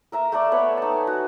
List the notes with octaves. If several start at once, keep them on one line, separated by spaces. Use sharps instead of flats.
A#4 E5 A#5
A3 A4 D5
B3 C#5 B5
D#4 A5
G#5
F#4